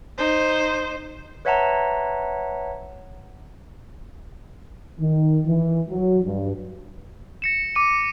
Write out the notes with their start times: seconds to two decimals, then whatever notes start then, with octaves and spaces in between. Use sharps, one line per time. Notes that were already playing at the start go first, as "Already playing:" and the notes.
0.18 D#4 C5
1.45 B4 C#5 E5 F#5 A5 A#5
4.99 D#3
5.45 E3
5.88 F#3
6.23 G2
7.42 A#6 C#7 E7
7.76 D6 D#7